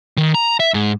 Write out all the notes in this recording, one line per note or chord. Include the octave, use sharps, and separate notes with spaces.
D#3
A#5
E5
G#2